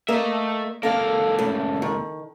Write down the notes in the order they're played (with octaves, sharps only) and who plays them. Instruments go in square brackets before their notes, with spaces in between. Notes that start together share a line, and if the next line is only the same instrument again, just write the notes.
[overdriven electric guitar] A3 E5 [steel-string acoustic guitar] A#3 D#5
[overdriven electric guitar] C#2 A#3 [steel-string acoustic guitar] A4 F5
[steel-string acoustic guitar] C#3 A3
D#3